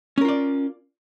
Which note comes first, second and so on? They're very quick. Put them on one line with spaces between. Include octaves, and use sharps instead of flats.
C#4 A#4 F4 D5